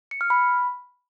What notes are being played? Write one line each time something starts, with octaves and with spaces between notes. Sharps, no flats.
C#7
F6
B5